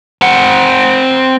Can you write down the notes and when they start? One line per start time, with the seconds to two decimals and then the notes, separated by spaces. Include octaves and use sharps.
0.22 C4 F#5